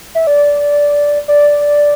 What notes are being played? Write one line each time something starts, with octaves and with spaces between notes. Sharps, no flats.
E5
D5
D5